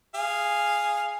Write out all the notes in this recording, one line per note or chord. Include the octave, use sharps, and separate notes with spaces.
G#4 F5